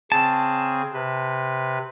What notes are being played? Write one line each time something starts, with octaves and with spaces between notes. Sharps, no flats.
C#3 C4 G#4 A5
C3 B4